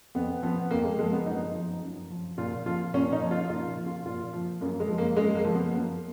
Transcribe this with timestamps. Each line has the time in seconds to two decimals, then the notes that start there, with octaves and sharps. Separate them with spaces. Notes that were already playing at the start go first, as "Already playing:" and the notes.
0.15 F2 B3
0.43 F3 B3
0.71 F2 A#3
0.85 G#3
0.99 F3 G#3
1.12 B3
1.26 F#2 D#4
1.55 F3
1.82 F#2
2.10 F3
2.38 A#2 F4
2.66 F3 F4
2.94 A#2 C#4
3.12 D#4
3.22 F3
3.31 F4
3.50 A#2 F4
3.77 F3
3.86 F4
4.06 A#2 F4
4.33 F3
4.61 F#2 A#3
4.80 G#3
4.89 F3
4.98 A#3
5.16 F#2 G#3
5.35 A#3
5.45 F3
5.54 B3
5.72 F#2 A#3